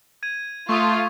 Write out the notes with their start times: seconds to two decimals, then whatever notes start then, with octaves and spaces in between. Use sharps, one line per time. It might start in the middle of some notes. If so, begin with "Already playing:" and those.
0.23 G#6 D#7
0.69 A3 F4 C#6 D#6